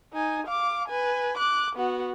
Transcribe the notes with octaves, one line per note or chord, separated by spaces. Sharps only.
D#4 G#5
F5 D6
B4 G#5
D6 F#6
B3 F#4